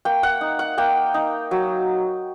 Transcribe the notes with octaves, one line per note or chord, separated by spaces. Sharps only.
A#3 G5
F#5
D#4
F#5
A#3 G5
D#4
F#3